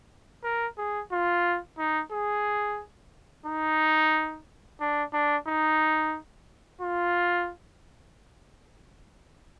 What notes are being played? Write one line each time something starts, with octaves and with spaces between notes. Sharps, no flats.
A#4
G#4
F4
D#4
G#4
D#4
D4
D4
D#4
F4